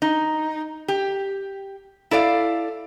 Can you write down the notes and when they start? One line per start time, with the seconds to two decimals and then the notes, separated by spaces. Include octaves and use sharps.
0.02 D#4
0.88 G4
2.11 E4 A4 D5 F5